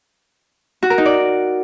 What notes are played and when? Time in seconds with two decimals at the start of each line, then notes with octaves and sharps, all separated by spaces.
0.83 F#4
0.90 A#4
0.98 D#4
1.06 D5